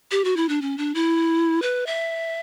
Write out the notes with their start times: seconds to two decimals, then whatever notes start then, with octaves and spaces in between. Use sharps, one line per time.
0.11 G4
0.24 F#4
0.37 E4
0.49 D4
0.62 C#4
0.78 D4
0.95 E4
1.62 B4
1.87 E5